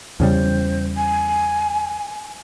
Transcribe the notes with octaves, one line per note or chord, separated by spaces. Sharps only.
E2 C#3 G3 C5
G#5